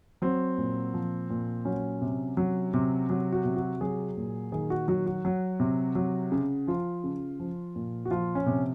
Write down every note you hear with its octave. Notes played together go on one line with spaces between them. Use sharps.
F#3 C4
A#2
F3
A#2
F#3 C#4
C3
F#3
C3
F#3
F#4
C3
F#4
F#3 G#4
A#2
D#3 G#4
F#4
F#3 F#4
F#4
F#3
C3
F#3
C#3
F3 F4
C#3
F3
A#2
F#4
F3 F4
C#4
C3